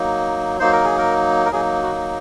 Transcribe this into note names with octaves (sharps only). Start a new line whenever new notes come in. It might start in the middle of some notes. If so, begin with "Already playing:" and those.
Already playing: F#3 A#3 D#4
F#3 A#3 D#4 C5
A#4
G#4
A#4
A#4
F#3 A#3 D#4 G#4
F#4